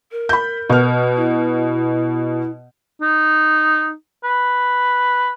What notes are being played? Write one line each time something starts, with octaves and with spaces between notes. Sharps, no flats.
A#4
B5 G6
B2 F6
E4
D#4
B4